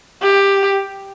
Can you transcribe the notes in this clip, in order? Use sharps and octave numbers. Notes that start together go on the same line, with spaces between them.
G4